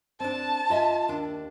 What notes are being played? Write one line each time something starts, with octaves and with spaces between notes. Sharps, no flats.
C4 D4 A5
F4 D#5 E5
D#2 D4